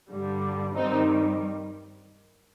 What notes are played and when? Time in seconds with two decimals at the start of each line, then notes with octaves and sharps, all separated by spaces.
0.10 G2 D3 G3
0.75 G2 D#3 G3 C4 D#4